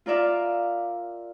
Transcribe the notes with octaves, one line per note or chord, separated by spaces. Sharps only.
F4 A#4 D5 E5 F5